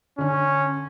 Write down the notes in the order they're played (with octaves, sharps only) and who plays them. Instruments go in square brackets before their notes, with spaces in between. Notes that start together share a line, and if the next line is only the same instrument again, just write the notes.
[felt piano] D3 D4 [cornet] C#4